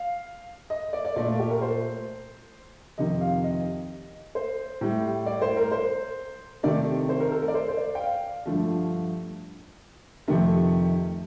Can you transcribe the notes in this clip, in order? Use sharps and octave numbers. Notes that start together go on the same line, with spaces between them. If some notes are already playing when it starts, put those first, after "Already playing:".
Already playing: F5
D#5
D5
D5
A#2 A3 D5
F4
G4
A#4
C5
F2 C3 D#3 D#5
F5
D#5
C5
A2 G3
D5
C5
A#4
C5
C3 D#3 A3 D5
C5
A#4
A4
A#4
D5
C5
C5
D5
G5
F5
G2 D3 F3 A3
F2 C3 D#3 A3